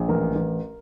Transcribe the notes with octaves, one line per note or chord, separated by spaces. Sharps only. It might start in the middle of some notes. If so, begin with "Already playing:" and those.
Already playing: A#1
A1 A#4
A1